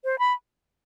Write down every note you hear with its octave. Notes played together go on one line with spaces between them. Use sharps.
C5
B5